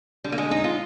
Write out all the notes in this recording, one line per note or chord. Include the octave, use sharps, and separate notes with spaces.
D3 G3
A#3
G#3
G#3 D#4
F4